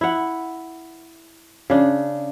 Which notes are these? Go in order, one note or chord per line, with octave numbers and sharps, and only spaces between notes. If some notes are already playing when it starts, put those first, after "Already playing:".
E4 F#5
C#3 D4